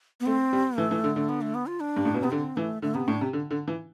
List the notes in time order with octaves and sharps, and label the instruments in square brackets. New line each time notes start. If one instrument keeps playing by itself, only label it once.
[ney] B3
[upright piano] A3 [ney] C4
[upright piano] G3
[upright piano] E3 [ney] A3
[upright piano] E3
D3
D3
[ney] B3
A3
B3
F4
D4
[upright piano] G2
A2
B2
[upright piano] C3 [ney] B3
[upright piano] D3 [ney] C4
[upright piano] E3 [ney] A3
[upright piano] D3 [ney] A3
[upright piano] C3 [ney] B3
[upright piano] A2 [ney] D4
[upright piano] C3
D3
D3
E3